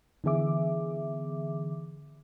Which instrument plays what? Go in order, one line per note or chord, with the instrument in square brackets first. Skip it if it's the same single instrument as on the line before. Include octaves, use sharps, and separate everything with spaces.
[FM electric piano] D3 E3 B3 G#4 E5 D6